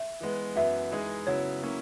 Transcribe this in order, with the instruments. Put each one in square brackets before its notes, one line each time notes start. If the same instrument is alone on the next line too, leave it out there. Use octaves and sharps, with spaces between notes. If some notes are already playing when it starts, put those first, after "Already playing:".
Already playing: [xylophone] E5
[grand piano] E3 G#3 B3
[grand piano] F#2 E3 B3 [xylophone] E5
[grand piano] E3 G#3 D#4 G#4
[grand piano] C#3 F#3 B3 E4 [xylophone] C#5
[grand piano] F#3 A#3 C#4 E4